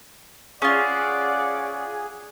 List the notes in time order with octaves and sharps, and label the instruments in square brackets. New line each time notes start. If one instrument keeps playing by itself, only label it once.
[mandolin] C#4 F4 [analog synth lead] G#4 [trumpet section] D5 F#5